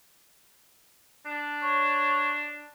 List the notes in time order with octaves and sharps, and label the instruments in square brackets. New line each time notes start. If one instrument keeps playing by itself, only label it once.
[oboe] D4
[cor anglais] C#5